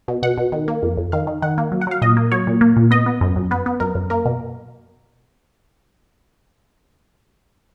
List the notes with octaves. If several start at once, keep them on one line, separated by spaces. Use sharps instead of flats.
B2
B2 F#5
B2
D#3
A#3
F2
F2
D#3 F5
D#3
D#3 F#5
A#3
F#3
F#5
F#3 F5
A#2 D#5
A#3
F#3 C#5
A#2
A#3
A#2
B3 D#5
B3
F#2
F#2
B3 B4
B3
F#2 A#4
F#2
A#3 A#4
B2